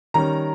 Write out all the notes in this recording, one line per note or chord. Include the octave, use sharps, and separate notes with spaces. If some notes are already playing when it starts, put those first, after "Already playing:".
D#3 G3 C#4 A#5